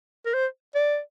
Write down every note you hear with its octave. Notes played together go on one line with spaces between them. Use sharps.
A#4
C5
D5